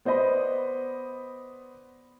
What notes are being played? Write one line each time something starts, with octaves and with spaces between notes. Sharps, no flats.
B3 C5 D5 D#5 B5